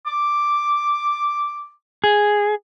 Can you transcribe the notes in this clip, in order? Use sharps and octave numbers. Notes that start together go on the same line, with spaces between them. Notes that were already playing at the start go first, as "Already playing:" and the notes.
D6
G#4